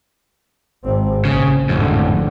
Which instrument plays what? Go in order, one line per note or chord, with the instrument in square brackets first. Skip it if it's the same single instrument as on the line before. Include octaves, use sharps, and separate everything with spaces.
[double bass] G#1 C4
[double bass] A#1 [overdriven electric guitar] C#3
[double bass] G#1 D3 [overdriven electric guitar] F2 A2